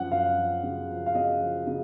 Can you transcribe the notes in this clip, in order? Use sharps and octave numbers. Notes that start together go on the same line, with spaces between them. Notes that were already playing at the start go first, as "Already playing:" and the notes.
Already playing: F#2 F3 F#5
F#2 F5
F3
C#3
F3
F5
C#3 D#5
F3
C#3